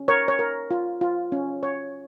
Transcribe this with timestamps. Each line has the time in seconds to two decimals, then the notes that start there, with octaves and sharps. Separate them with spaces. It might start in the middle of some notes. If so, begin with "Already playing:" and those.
Already playing: C#4
0.08 A#4 C#5
0.28 C#5
0.39 A#4
0.71 F4
1.01 F4
1.32 C#4
1.63 C#5